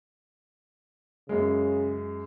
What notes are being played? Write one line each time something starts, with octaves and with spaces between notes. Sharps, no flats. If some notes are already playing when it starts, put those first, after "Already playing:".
F#2 C#3 G#3